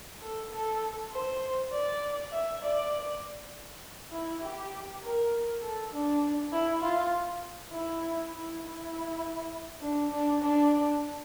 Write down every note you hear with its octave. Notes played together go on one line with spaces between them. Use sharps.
A4
A4
C5
D5
E5
D5
E4
G4
A#4
A4
D4
E4
F4
E4
E4
E4
D4
D4
D4